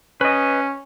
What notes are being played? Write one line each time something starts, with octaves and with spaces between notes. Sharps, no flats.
C#4 B4 D#5